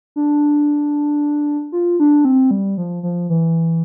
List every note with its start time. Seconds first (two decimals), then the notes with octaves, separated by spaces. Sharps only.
0.16 D4
1.72 F4
2.00 D4
2.25 C4
2.51 G3
2.77 F3
3.03 F3
3.30 E3